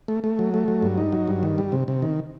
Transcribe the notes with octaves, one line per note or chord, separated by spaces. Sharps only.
A3
A3
F#3
A3
F#3
G2
D#4
F#3
G2
D#3
G3
C3
C3
D#3